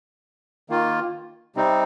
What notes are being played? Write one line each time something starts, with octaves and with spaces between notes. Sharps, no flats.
D#3 A#3 F4
C3 G3 C4 D#4